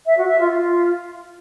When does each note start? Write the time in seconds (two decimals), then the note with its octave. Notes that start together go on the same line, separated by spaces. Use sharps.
0.05 E5
0.17 F#4
0.28 E5
0.40 F4
0.51 F4